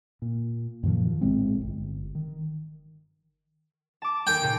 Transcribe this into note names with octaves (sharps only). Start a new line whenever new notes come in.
A#2
F#2 A#2 D#3 F3
A#1 A2 G#3 C4
G1
D#3
A5 D6
D#2 G5 G#5
A#2 C#3